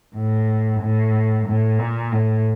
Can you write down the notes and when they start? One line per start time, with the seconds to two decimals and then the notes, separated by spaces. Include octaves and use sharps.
0.16 A2
0.81 A2
1.47 A2
1.79 A#2
2.12 A2